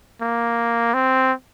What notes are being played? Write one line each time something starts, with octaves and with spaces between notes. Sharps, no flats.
A#3
C4